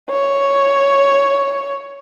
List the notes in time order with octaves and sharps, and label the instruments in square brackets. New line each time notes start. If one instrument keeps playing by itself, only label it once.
[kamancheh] C#5